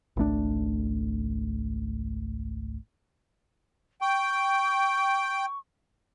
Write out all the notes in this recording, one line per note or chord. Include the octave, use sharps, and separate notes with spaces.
G#1 C#2 A3 D4
G5 C#6